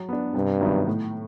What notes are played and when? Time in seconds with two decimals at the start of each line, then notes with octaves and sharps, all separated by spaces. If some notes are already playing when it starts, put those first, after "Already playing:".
Already playing: F#3
0.09 B3 D4
0.35 G2 C3
0.61 D#3 F#3 B3 E4
0.87 A2